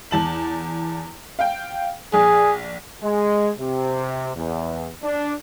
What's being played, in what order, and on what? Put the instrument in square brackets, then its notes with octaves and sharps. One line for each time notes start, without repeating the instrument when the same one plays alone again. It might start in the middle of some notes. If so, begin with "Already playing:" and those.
[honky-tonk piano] E2 A5 F#7
F5 G5
[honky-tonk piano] A#1 [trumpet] G#4
[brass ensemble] G#3
C3
E2
D4